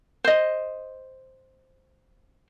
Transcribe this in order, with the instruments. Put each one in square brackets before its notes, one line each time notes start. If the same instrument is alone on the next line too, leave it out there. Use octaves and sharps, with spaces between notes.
[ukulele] C5 D#5